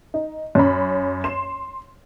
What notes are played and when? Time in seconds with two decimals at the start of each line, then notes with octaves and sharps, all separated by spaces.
0.14 D#4
0.55 F#2 C#4 B5
1.24 C6 E7